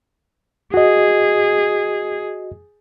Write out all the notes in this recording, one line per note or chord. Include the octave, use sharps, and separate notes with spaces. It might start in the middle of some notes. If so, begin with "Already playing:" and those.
F#4 G#4 D#5